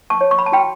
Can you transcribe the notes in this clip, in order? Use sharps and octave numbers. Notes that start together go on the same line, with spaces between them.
A5 C#6
C#5
C#6
B5
A5
F#4 G5 B5